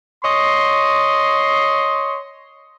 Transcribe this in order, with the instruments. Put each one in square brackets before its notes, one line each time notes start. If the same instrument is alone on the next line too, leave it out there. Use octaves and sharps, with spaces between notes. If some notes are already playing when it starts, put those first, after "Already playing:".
[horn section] C#5 D#5 C6